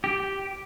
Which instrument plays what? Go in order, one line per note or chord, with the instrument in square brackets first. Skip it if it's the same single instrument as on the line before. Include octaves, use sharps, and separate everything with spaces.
[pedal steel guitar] G4